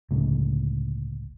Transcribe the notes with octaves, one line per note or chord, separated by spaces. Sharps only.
G1 C#2 A2 C#3